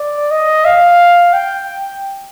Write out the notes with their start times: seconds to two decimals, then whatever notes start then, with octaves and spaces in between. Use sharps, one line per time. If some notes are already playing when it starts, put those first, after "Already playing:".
Already playing: D5
0.31 D#5
0.65 F5
1.34 G5